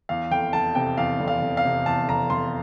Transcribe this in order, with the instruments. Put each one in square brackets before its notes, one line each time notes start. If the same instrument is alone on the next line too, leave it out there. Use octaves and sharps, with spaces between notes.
[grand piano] E2 F5
F1 G5
F1 A5
C3 G5
E2 F5
F1
F5
F1
F5
C3
E2 A5
F1 A#5
F1 C6